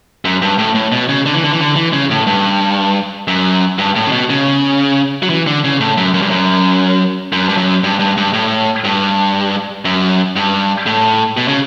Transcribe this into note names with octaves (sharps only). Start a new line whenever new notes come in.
F#2
G2
A2
A2
B2
C#3
D3
E3
D3
E3
D3
E3
C#3
A2
G2
F#2
G2
A2
C#3
B2
C#3
F#3
E3
D3
C#3
A2
F#2
F#2
G2
F#2
F#2
G2
F#2
G2
G2
G2
A2
G2
F#2
G2
A2
B2
C#3